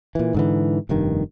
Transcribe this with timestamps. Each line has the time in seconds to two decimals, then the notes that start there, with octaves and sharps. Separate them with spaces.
0.15 A#2 E3
0.34 G#2 D3 E3
0.89 F1 G2 D#3